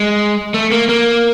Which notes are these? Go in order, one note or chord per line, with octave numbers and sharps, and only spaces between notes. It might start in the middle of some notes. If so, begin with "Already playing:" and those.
Already playing: G#3
A3
A#3
A#3